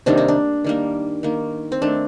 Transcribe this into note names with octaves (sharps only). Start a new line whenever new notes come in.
C3 D#3 G3 A#3 D4
D#4
D4
D#3 G3 A#3
D#3 A#3
C4
D#3 A3 D4